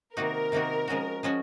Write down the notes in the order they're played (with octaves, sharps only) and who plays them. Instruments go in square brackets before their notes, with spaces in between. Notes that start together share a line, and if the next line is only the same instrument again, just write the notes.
[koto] C3 D#3 A#3 D#4 F#4 [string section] A#4
[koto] C3 D#3 A#3 D#4 F#4
F3 G#3 C#4 F#4
F3 G#3 C#4 F#4